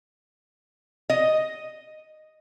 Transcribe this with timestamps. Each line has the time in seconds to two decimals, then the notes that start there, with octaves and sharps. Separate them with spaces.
1.10 D#5